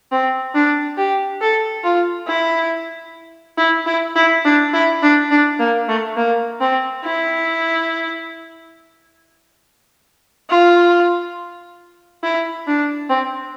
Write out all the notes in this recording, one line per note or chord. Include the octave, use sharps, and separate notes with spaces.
C4
D4
G4
A4
F4
E4
E4
E4
E4
D4
E4
D4
D4
A#3
A3
A#3
C4
E4
F4
E4
D4
C4